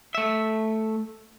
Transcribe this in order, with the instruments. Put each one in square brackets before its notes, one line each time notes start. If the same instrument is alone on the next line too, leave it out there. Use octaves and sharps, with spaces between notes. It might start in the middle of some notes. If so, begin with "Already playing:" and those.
[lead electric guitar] A3 E5